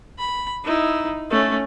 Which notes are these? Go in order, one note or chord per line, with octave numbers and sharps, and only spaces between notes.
B5
D#4 E4
A3 C#4